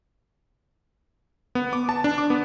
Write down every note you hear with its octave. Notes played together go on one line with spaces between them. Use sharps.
B3
D6
A5
D4
D6
B3